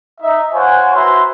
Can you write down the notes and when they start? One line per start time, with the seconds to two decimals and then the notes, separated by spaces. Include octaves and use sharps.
0.21 D#4 E5
0.54 F4 C5 C#5 F#5 G#5
0.95 E4 F#4 B4 C5 A#5 C6